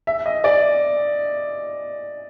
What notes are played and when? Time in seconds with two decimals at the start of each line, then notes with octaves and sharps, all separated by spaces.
0.07 E5
0.26 D#5
0.44 D5